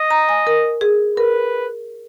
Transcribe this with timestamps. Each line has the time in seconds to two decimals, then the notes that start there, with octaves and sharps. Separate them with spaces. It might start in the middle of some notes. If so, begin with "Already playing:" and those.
Already playing: D#5
0.10 A#5
0.29 G#5
0.47 A#4
0.81 G#4
1.17 A#4 B4